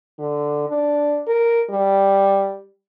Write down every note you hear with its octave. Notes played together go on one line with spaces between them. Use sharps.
D3
D4
A#4
G3